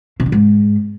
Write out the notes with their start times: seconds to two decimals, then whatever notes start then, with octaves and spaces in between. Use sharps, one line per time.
0.20 C3
0.26 D3
0.32 G#2